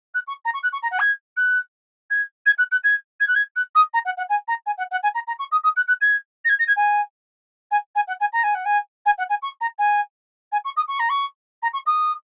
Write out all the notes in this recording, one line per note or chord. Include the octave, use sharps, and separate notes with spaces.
F#6
C#6
A#5
C#6
F#6
C#6
A#5
F#5
G#6
F#6
G#6
G#6
F#6
F#6
G#6
G#6
F#6
G#6
F#6
D#6
A#5
F#5
F#5
G#5
A#5
G#5
F#5
F#5
G#5
A#5
A#5
C#6
D#6
D#6
F#6
F#6
G#6
A#6
G#6
A#6
G#6
G#5
G#5
G#5
F#5
G#5
A#5
G#5
F#5
G#5
G#5
F#5
G#5
C#6
A#5
G#5
G#5
C#6
D#6
C#6
A#5
C#6
A#5
C#6
D#6